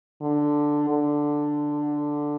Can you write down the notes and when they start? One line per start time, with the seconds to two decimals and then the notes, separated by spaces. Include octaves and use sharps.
0.21 D3
0.90 D3